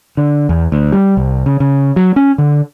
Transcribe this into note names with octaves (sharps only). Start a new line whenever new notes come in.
D3
E2
D2
G3
C2
C#3
C#3
F#3
C#4
D3